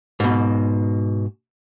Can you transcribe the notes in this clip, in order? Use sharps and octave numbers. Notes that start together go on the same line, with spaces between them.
G#2 B2